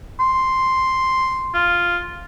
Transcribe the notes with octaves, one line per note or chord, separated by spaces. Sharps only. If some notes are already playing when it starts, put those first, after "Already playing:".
C6
F4